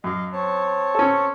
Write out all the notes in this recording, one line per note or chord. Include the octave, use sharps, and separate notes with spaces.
F#2 D#5 F5
C4 C#5 A5
C#4 A4